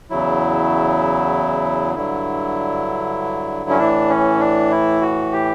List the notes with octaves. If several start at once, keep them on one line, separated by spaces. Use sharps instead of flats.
E2 C#3 F#3 E4
G2 D3 F#3 E4
C#4
A2 E3 D4
C#4
D4
E4
F#4
G4